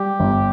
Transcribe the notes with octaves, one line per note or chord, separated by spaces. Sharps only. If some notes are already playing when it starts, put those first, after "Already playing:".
Already playing: G3 G4
G1